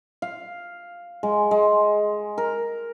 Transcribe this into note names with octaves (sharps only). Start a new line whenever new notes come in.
F5
G#3
G#3
A#4